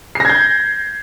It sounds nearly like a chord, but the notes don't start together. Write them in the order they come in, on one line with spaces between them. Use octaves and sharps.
C7 A#6 G#6 G6